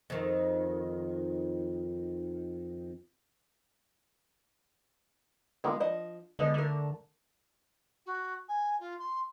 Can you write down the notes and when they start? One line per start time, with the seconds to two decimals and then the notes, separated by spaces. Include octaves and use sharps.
0.10 F2 D#3
5.64 D3 G#3 A#3 B3 F4
5.80 F3 D4 D#5 F#5
6.39 D3 G#3 B3 D#5
6.54 D3 A3 A#4
8.05 F#4
8.48 G#5
8.80 F4
8.99 C6